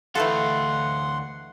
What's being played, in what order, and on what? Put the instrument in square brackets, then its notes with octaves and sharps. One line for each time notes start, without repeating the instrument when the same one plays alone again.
[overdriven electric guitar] D2 F5 [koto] E3 A3 A4 [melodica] F#5 C6